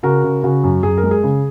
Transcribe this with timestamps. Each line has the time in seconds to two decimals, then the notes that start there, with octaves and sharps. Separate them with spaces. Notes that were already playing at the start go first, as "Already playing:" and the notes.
0.03 C#3 F#4 A#4
0.24 C#3
0.43 C#3 F#4
0.64 F#2
0.83 F#2 G#4
0.98 A#4
1.03 G#3
1.11 G#4
1.23 C#3